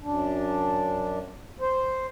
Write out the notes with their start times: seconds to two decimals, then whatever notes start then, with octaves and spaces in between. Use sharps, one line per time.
0.02 F#2 D4
1.60 C5